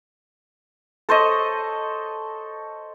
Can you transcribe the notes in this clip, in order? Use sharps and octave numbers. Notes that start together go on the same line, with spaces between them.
A4 C5 C#5 D#5